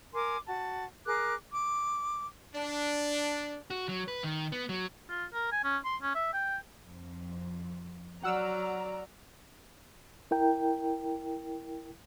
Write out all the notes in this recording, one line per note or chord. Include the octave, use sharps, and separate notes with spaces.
A#4 G#5 C6 D6
F#4 A5
G#4 A#4 D6 F#6
D6
D4
F#4
F#3
B4
D#3
B3
F#3
F4
A#4
G#5
C#4
C6
C#4
E5
G5
F2
F#3 D5 F#5 A#5 E6 F6
E4 A#4 G5